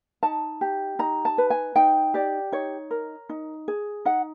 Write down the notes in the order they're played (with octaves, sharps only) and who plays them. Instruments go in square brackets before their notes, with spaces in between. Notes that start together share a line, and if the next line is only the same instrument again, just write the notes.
[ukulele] D#4 A5
G4
D#4 A#5
A5
B4
G#5
D#4 G5
G4 D5
D#4 C#5
A#4
D#4
G#4
D#4 F#5